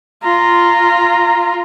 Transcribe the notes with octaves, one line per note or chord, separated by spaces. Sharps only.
F4 A#5